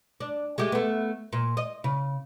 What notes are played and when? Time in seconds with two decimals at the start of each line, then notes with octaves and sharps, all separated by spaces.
0.20 D4
0.58 G#3 A3 G4
0.72 A3 B3
1.33 A#2
1.57 D#5
1.84 C#3